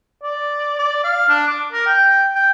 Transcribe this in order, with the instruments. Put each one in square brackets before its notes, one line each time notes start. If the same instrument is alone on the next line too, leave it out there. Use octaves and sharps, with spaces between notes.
[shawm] D5
D5
F5
D4
D6
A#4
G5
G5